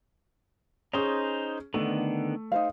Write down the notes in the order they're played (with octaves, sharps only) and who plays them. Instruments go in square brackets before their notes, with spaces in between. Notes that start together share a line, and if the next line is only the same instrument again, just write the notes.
[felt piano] C#4 G#4 [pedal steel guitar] D#4 C5
[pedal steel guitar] D3 D#3 B3 [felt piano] A3
[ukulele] D#4 C5 F5